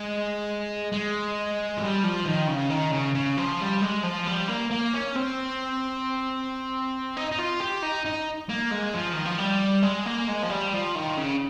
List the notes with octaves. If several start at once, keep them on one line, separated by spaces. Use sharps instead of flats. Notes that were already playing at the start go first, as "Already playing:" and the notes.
Already playing: G#3
G#3
F3
G3
F3
D#3
C#3
D#3
C#3
C#3
F3
G3
G#3
F3
G3
A#3
A#3
C#4
C4
D#4
D#4
F4
G4
D#4
D#4
A#3
G#3
F3
D#3
F3
G3
G#3
A#3
G#3
F3
G3
F3
D#3
C#3